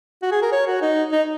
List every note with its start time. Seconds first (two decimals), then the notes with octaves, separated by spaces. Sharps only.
0.23 F#4
0.32 G#4
0.42 A#4
0.52 C#5
0.67 F#4
0.82 D#4
1.12 D#4